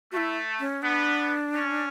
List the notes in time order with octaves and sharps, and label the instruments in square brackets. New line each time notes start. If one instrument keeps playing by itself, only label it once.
[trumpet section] A3 [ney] F#4
[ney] E4
C#4
[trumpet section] B3 [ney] D4
[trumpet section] C#4